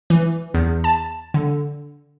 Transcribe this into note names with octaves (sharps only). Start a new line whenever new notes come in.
E3
E2
A5
D3